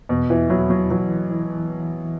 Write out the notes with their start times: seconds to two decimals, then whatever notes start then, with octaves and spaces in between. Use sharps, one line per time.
0.09 E2 B2
0.30 E3
0.50 F#3 E4
0.70 F#3
0.90 E3 F#3
1.31 E3